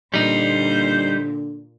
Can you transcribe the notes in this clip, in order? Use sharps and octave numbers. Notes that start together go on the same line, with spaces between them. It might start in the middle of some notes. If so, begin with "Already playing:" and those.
A#2 D3 G3 D#4 C5